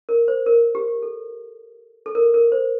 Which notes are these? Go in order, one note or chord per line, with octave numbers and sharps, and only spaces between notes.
A#4
C5
A#4
G4
A4
A4
A#4
A#4
C5